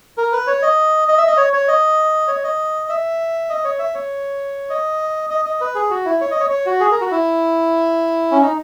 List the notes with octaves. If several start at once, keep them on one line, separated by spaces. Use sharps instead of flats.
A#4
B4
C#5
D#5
D#5
E5
D#5
C#5
C#5
D#5
C#5
D#5
E5
D#5
C#5
E5
C#5
D#5
D#5
D#5
B4
G#4
F#4
E4
C#5
D#5
C#5
C#5
F#4
G#4
A#4
F#4
E4
C#4
D#4